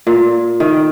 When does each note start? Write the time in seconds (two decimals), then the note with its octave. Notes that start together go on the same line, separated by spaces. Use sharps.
0.07 A#2
0.60 D#3